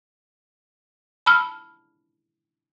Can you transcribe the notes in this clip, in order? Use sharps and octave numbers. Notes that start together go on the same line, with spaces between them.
A5 B5 E6 F6